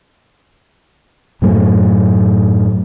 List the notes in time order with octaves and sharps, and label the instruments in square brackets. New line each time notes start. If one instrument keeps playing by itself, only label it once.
[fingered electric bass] F#2 A2 F#3 A3